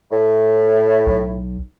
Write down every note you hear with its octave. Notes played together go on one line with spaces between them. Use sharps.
A2
B1